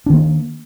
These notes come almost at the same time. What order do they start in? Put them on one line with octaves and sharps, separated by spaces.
D4 D#3 A#3